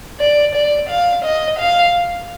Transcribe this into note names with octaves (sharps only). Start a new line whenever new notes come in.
D5
D5
F5
D#5
F5